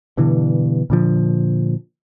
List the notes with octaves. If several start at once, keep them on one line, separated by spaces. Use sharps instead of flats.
G2 B2 D3 E3
A#2 D3 F3